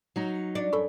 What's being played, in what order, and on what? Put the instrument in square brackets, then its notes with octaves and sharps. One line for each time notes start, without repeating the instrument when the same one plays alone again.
[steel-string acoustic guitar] F#3 D#4
[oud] D4 [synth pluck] A6 C#7
[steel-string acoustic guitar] F#2 [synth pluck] A4 B5 C#6